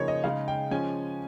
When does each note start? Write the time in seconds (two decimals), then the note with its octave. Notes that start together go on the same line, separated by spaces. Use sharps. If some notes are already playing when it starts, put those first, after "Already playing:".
Already playing: C#3 F3 A#3 D#4 C#5
0.08 D#5
0.24 C#3 G#3 D#4 F5
0.48 G5
0.71 F3 G#3 C#4 G#5